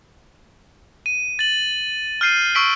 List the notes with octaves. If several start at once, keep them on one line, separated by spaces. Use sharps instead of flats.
D#7
A6 F#7
F6 G6 C7 D#7
C#6 E6 B6 D7